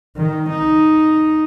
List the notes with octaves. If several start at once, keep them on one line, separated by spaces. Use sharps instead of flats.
D#3
D#4